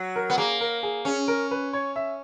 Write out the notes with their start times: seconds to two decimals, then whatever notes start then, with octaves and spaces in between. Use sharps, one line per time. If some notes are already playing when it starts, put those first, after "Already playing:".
Already playing: F#3
0.16 A#4
0.30 B3
0.38 A#3 G#4
0.61 A#4
0.83 G#4
1.05 C#4 G#4
1.28 A#4
1.51 B4
1.73 C#5
1.96 E5